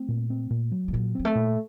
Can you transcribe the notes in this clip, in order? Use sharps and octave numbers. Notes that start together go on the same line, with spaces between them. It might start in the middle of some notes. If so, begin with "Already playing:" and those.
Already playing: A3 C4
A#2
C4
A#2
F#3
A3
A#2 F#3
F#3 C4
A3
A#2